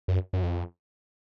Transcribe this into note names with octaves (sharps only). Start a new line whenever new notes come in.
F#2
F#2
F2